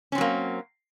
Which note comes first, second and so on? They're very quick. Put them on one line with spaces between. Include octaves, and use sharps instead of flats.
C#4 C4 F#3 A#3